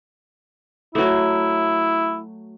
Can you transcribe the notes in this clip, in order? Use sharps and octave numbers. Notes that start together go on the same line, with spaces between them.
F#3 A3 E4